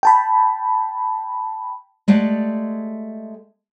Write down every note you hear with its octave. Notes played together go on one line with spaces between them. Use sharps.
G5 A5 B5
G#3 A3 G4 D5 F#5